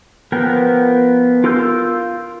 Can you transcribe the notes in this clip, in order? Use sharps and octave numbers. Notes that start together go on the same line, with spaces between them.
F3 B3 A#4 G5
F4 A#4 C6 E6 G6